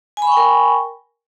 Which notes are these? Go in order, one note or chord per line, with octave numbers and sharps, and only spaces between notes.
A#4 G5 G#5 B5 C#6